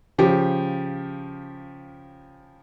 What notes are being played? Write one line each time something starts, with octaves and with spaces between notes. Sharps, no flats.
C#3 F3 G4